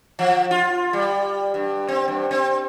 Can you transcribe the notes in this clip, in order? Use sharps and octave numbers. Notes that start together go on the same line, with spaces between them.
F3
F4
G3
G2
C4
G2
C4